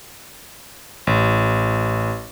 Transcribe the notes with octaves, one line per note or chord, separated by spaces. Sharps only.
A1